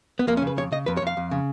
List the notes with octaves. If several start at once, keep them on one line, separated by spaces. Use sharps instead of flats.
B3
F2 A#3
C#4
C#3 B4
F2 C#5
C#3 D#5
F2 B4
C#5
F2 F5
F2
C#3